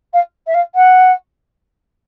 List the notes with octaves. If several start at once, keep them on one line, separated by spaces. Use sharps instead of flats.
F5
E5
F5
F#5